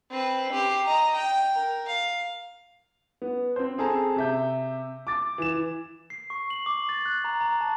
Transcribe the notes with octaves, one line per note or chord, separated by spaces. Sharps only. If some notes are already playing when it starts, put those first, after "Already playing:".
C4 B4
G4 C6
D#5 A#5
G5
A#4
F5
B3
C4 C5
C4 G#4 A4 A5 A#5
C3 E5 G6
D6 A6
E3 E7
C7
C#6
F#7
D6
A6
F#6
A#5
A#5
A5